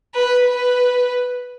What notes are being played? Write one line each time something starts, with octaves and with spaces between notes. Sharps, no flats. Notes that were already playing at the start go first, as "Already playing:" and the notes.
B4
B4